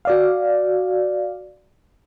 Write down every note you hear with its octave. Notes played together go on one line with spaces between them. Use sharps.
F#4 D5 F5